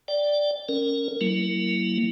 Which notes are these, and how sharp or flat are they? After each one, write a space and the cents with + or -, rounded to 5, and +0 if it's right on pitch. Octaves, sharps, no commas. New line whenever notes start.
D5 +0 G5 +0
C#4 +0 A#4 -10
F#3 +15 A#3 -20 E4 +0